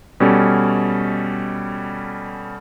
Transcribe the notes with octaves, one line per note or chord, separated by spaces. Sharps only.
B2 G3 C#4 A4